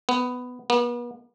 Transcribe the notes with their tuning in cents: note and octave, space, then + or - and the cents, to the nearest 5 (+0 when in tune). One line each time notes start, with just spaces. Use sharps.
B3 +10
B3 -40